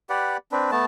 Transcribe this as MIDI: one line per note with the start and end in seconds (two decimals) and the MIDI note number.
0.10 0.37 67
0.10 0.37 71
0.10 0.37 74
0.10 0.37 78
0.52 0.71 60
0.52 0.71 62
0.52 0.71 71
0.71 0.85 57
0.71 0.85 59
0.71 0.85 81